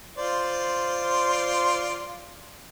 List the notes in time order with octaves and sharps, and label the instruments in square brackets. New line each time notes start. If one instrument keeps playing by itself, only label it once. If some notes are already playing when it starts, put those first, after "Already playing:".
[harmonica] F4 C5 D5